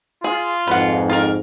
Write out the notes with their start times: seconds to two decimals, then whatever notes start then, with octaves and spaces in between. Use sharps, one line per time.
0.24 F4 G#4
0.68 F2 G#2 B4 F#5
1.09 F4 A#4